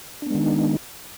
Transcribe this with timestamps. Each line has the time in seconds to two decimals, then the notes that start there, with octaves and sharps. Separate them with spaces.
0.22 D4
0.26 B3
0.30 G#3
0.35 D#3
0.39 D#4